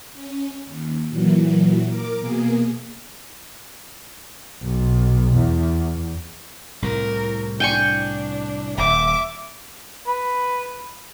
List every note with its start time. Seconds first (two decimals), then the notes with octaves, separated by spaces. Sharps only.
0.14 C#4
0.66 D#2
1.10 A#2 E3 F#3
1.88 A#4 D6
2.21 B2 A#3 G#4
4.63 B1
5.36 E2
6.82 C2 A2 C3 A#4
7.60 D4 G5 G#5 C#6
8.78 D#1 E5 D6
10.07 B4